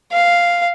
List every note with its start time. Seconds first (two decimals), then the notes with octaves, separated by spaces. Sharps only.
0.12 F5